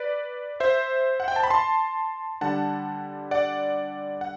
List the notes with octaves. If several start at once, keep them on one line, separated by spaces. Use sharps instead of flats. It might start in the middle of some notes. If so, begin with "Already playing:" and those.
Already playing: B4 D5
C5 E5
F#5
G5
A5
B5
A5 C6
D3 G3 D4 F#5 A5
D5 F#5
F#5